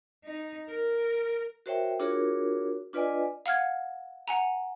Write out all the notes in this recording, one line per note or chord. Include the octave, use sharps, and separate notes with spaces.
D#4
A#4
F#4 A#4 C5 C#5 E5 G5
D4 F4 F#4 G#4 A#4 C#5
D4 F4 B4 D5 D#5 G#5
F5 F#5 F6 G#6
F#5 G#5 A#5